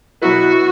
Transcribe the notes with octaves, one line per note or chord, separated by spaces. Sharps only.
B2 F#3 B3 E4 F#4 B4